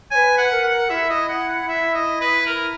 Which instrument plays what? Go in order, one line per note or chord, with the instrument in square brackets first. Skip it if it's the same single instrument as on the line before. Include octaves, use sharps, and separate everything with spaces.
[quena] B4 C#5 [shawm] G#5
[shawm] F#5
[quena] A#4
[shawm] F#5
[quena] E4 [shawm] E5
[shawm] D#5
F#5
F#5
E5
D#5
B4
A#4